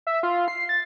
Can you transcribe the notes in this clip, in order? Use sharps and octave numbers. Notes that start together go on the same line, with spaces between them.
E5
F4
C7
A6